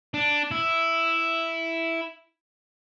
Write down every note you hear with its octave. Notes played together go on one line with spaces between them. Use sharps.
D4
E4